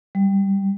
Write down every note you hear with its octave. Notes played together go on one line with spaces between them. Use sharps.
G3